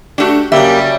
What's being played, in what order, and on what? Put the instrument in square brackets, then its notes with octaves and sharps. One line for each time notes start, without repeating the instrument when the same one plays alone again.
[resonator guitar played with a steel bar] A3 D4 [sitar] F#4 G4
[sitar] C#3 F#3 G3 [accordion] A#3 G4 [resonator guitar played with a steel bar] E5